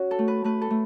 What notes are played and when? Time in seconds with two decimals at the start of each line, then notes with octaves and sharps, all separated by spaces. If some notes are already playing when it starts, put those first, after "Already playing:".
Already playing: C#4 F#4
0.11 A4
0.19 A3
0.28 B4
0.44 A3 B4
0.62 A4
0.70 A3